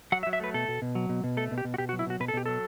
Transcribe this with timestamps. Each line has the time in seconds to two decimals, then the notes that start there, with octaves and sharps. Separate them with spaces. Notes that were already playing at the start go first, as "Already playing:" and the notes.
0.12 F#3 F#5
0.23 E5
0.27 F#3
0.33 E5
0.40 A3 B4
0.54 B2 A4
0.68 B2
0.82 B2
0.95 F#3
1.09 B2
1.24 B2
1.37 A3 A4
1.51 B2
1.58 G4
1.65 B2
1.74 F#4
1.78 B2 G4
1.89 F#4
1.93 F#3
1.99 E4
2.07 B2 F#4
2.20 B2 B4
2.28 A4
2.34 B2 G4
2.46 F#3 A4